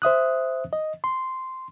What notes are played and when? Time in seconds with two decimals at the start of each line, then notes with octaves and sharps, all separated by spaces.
0.02 C5 E5 D#6 F#6
0.73 D#5
1.04 C6